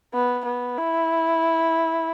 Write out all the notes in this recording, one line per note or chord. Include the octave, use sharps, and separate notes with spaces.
B3
B3
E4